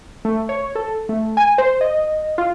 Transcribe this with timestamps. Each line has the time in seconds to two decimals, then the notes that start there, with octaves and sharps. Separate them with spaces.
0.25 A3
0.49 C#5
0.75 A4
1.09 A3
1.37 G#5
1.58 C5
1.81 D#5
2.38 F4